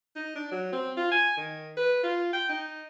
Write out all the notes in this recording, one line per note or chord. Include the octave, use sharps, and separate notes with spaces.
D#4
D4
F#3
C4
F4
G#5
D#3
B4
F4
G5
D#4